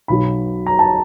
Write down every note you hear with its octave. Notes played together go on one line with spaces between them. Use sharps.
B1 B2 F#3 B5
A#5
A5